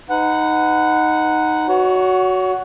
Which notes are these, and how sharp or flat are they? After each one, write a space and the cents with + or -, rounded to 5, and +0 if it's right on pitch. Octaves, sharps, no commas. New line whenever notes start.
D#4 +0 B4 +35 F#5 +0
F#4 +0 C#5 +30